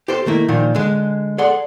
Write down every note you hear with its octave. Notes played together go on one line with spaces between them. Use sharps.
G4 A4 C5
D#3 A3 A#3 E4
A#2 D#3 F3
D3 G#3
G#4 A4 D5 F#5 C6